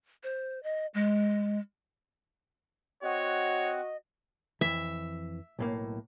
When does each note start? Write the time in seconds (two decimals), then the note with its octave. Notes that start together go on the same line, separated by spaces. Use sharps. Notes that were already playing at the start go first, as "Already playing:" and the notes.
0.23 C5
0.63 D#5
0.94 G#3
3.03 C4 F#4 C#5 D#5 F#5 C#6
4.61 F2 E3 E5
5.59 B1 A2 A#3